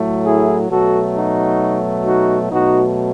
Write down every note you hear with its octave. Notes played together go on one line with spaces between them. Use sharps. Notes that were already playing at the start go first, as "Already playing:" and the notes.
Already playing: A2 F#3 A3
E4 G#4
B2 F#3 A3 F#4 A4
D#4 F#4
D#4 F#4
B2 F#3 A3 D#4 F#4